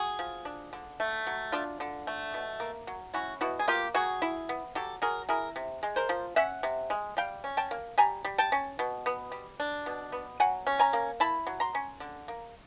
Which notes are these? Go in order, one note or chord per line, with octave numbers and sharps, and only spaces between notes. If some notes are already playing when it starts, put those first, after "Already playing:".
Already playing: F#4 G#4
F3
D4
D3
A3
F#3
D4 F4
D3
A3
B2
A#3
F#3
C#4 E4 F#4
B2 E4 F#4
G#4
A#3 F4 G4
F#3 F#4 G#4
E4
B3
F#3 G4 A4
F#3 G#4 A#4
E4 G#4 A#4
C3
G#3
A#4 C5
F3
C#4 E5 F#5
C3
G#3
G3 F5 G5
C#4
G5 A5
A#3
G3 G#5 A#5
G3
G5 A5
C#4
B2
B3
G3
D4
B2
B3
F#3 F#5 G#5
C#4
G#5 A#5
A#3
E4 A5 B5
F#3
A#5 C6
C#4
D3
A#3